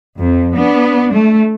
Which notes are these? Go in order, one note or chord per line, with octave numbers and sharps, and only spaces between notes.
F2
B3 D4
A3